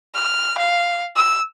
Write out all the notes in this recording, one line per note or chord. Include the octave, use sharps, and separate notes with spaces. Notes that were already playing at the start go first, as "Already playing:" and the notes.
F6
F5
E6